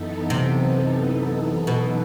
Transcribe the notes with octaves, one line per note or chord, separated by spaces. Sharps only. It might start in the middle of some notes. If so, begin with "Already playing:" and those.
Already playing: F#2 E3 B3 D#4 A4
C3
B2